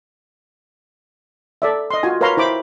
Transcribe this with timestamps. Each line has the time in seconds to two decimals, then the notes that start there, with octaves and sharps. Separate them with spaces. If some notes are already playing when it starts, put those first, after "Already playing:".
1.62 A4 D5 E5
1.91 D#5 C6
2.03 F4 F#4 G#5
2.21 A#4 B4 C#5 F5 A#5 C6
2.37 E4 C5 B5 D6